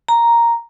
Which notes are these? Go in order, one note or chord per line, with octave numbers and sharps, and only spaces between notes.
A#5